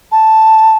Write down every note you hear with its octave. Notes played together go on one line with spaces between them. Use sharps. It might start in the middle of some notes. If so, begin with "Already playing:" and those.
A5